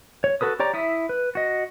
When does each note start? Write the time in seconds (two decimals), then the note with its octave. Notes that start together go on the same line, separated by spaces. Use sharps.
0.24 C#5
0.41 F#4 A4 B4 D#6
0.59 G4 C#5 D5 A#5
0.73 E4 E5 D#6
1.09 B4
1.35 F#4 D#5